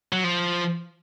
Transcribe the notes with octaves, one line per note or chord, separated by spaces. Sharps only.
F#3
F3